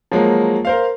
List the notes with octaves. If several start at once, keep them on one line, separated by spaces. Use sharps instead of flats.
F3 F#3 G#3 A#3
A#4 C5 F5